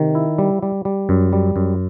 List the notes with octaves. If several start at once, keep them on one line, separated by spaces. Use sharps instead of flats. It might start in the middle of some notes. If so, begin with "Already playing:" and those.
Already playing: C3 D#3
E4
G3
G3
G3
F#2
G3
F#2